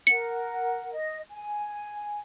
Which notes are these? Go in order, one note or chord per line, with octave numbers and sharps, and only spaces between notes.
A#4 F#5 C#7
D#5
G#5